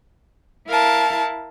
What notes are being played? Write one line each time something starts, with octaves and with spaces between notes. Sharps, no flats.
E4 A#4 F5 A5